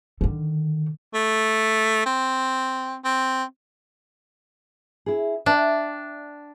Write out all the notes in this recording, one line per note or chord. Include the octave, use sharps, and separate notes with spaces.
D3 D#3
A3
C4
C4
E4 G#4
D4 D5 E5 G5